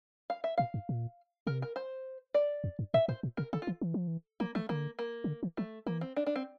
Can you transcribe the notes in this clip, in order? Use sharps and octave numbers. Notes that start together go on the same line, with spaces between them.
F5
E5
A#2 F5
G2
A#2
C3 A#4
A#4
C5
D5
F2
G2
A2 E5
A2 C5
A#2
C3 A#4
D3 A4
F4
E3
E3
F3
E3
F3 A#3
E3 A3
D3 A#3
A#3
E3
D3
E3
F3 A3
E3 A#3
C4
D4
D4
C4